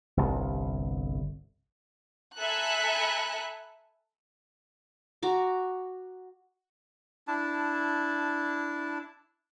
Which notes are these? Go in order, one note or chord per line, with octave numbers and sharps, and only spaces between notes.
G1 C2
A4 E5 G#5 A#5 B5 F#6
F#4 A#5 D6
D4 E4 A5